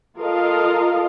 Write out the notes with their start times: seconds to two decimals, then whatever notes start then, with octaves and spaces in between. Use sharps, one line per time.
0.17 F4 A4 A#4 D#5 F5